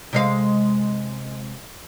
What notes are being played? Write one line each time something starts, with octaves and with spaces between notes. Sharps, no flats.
C3 G#3 F5